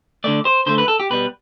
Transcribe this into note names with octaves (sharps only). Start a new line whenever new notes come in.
D3 A3 D5
C5
D3 A3 C5
B4
A4
G4
B2 G3 B4